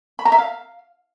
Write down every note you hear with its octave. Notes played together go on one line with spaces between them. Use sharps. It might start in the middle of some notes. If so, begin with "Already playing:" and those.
B5
A#5
E5
F5